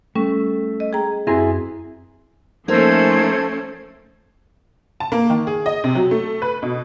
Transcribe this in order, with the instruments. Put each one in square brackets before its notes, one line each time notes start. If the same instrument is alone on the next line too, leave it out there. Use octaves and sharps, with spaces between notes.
[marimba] G3 C#4 [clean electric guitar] A3
[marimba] D#5
G#4 G5 A#5
[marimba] F#2 C4 A#6 [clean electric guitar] E4 G#4
[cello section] F3 A3 C#4 [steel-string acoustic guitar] A#3 D#4 [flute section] A4 C5 G#6
[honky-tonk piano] A5
A#3
D#3
G#4
D#5
C3
F#3
A3
B4
B2